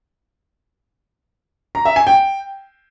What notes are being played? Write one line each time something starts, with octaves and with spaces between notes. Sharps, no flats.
A#5
E5
G#5
G5